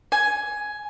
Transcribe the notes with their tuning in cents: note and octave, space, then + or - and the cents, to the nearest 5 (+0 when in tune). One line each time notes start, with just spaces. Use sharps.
G#5 +10